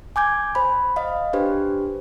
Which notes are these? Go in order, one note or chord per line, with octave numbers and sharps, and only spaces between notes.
G#5 D6 G6 G#6
C5 B5
D#5 F5
D4 G4 B4 C5